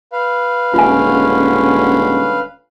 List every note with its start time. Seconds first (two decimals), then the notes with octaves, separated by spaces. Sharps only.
0.12 B4 F5
0.74 D#1 D3 G#3 C#4 F4 G#5